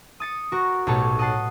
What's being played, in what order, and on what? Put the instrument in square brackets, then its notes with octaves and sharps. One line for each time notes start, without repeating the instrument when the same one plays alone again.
[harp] D#6 A6 C#7
F#4 A#4 C#6
B1 A2 G4 A4 C#5 A5
D#5 F#5 A5 C7